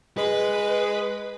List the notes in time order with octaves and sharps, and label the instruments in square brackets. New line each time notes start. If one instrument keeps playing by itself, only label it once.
[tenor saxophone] G#3 [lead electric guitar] B4